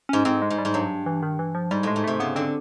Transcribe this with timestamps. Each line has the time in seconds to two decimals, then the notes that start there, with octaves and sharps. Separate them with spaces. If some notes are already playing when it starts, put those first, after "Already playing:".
0.09 G#2 C#4
0.25 G#2 C4
0.42 G#3
0.50 G#2
0.58 G3
0.65 G#2
0.74 G2 F#3
1.06 E3
1.23 D#3
1.39 E3
1.55 F3
1.71 G#2 G3
1.83 A2 G#3
1.96 G#2
2.04 C3 A3
2.20 C#3 B3
2.36 D3 C4